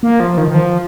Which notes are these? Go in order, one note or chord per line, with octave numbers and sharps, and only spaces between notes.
A#3
F3
D#3
D#3
F3